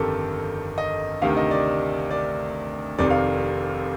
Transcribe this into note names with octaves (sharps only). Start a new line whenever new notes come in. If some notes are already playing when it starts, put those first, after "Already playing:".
Already playing: G1 F2 D#3 G4 A4 A#4
D#5
D2 C3 D#3 F5
D#5
D5
D5
F1 F2 C3 D#3 D5
F5